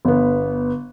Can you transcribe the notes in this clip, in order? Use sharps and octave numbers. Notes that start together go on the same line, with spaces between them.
G1 B3